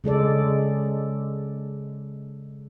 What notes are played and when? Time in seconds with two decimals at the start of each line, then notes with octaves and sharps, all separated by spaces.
0.04 C#3 G#3 A4 D5